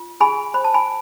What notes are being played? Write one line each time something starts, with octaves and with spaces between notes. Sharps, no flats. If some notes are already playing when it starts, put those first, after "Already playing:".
Already playing: F4
G#4 G#5 B5
C5 B5
A5
G#5 B5